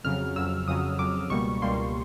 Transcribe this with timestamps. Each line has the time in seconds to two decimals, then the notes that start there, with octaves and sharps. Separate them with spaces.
0.04 F2 C#3 F#3 F6
0.36 F2 C#3 F#3 E6
0.68 F2 C#3 F#3 D#6
0.99 F2 C#3 F#3 D6
1.30 C#2 B2 G3 A#3 C#6
1.62 C#2 B2 G3 A#3 C6